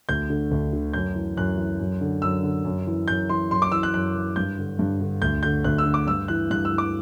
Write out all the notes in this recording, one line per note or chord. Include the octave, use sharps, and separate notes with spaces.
D2 G6
D3
D2
D3
F#2 G6
E3
F#2 F#6
E3
F#2
D3
F#2 E6
D3
F#2
E3
F#2 G6
E3 C6
F#2 C6
D6
E3 E6
F#6
F#2 F#6
E3
G2 G6
D3
G2
D3
D2 G6
D3 G6
D2 F#6
E6
D3
D6
G2 E6
E3 F#6
G2 F#6
E6
E3
D6